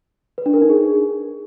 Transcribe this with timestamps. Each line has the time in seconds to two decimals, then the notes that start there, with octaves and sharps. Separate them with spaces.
0.38 B4
0.46 D4
0.54 A#4
0.62 D#4
0.70 G#4